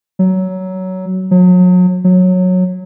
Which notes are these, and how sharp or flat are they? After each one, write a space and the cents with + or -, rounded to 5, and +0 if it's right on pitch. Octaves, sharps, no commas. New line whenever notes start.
F#3 +15
F#3 -35
F#3 -15